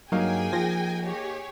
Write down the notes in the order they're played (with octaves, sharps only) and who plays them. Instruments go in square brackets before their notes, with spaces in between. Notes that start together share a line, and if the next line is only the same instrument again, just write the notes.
[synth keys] G2 F#3 [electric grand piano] A#3 D#4 F5 [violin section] G#4 G5 G#5
[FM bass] F3 [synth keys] A#6
[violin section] G4 G#4 C#5